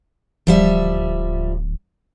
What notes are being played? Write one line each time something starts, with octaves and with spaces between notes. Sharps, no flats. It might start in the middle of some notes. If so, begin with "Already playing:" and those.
D1 F3 G3 E5